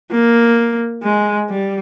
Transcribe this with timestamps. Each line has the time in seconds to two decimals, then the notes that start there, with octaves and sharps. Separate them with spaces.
0.12 A#3
1.03 G#3
1.49 G3